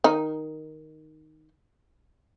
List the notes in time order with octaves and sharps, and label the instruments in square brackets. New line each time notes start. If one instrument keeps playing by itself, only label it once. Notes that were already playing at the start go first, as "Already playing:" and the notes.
[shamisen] D#3 D#4